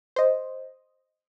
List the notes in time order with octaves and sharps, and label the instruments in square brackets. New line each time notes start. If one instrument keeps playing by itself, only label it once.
[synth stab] C5 D#5